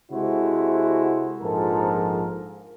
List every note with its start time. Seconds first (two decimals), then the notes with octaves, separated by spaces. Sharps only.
0.11 C3 G#3 E4 F#4 A4 C5
1.42 A#1 G#2 F3 A4 A#4